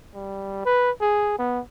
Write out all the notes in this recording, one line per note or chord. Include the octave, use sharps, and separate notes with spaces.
G3
B4
G#4
B3